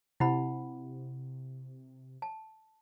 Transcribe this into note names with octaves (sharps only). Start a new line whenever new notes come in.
C3 E4 F#5 B5
A5